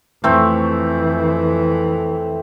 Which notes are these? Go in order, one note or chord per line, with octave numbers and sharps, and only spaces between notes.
F2 E3 A3 C4